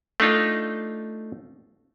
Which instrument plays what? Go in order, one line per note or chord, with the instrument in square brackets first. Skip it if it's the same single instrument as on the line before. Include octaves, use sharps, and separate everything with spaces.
[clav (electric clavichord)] A3 D4 D#4 F4